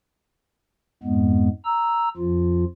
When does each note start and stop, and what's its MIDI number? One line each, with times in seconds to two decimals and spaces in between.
1.03 1.49 41
1.03 1.49 44
1.03 1.49 56
1.03 1.49 59
1.65 2.09 82
1.65 2.09 88
2.17 2.65 41
2.17 2.65 53
2.17 2.65 65